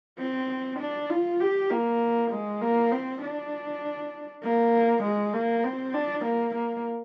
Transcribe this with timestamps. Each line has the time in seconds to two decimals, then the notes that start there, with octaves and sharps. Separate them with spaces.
0.18 C4
0.79 D4
1.10 F4
1.40 G4
1.70 A#3
2.31 G#3
2.61 A#3
2.91 C4
3.22 D4
4.43 A#3
5.03 G#3
5.33 A#3
5.64 C4
5.94 D4
6.25 A#3
6.55 A#3